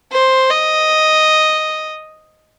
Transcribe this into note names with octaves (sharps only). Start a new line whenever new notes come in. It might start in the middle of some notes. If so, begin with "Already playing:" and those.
C5
D#5